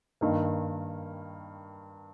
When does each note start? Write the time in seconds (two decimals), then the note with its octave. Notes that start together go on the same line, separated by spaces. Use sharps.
0.21 G2 D#3 A#3